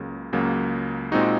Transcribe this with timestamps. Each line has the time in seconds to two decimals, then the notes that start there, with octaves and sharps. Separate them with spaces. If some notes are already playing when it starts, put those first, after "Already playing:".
Already playing: C#2 C#3 F#3 A#3
0.33 C#2 C#3 F#3 A#3
1.12 A#2 G#3 C4 D#4 F#4